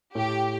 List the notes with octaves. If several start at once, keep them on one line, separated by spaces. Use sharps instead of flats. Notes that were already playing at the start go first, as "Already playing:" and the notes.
A2 G4